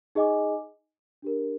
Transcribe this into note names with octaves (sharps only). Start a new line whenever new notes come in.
D#4 G#4 D#5 G#5 D6
D4 G4 A#4